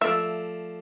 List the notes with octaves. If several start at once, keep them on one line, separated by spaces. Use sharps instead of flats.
F3 A3 D5 E5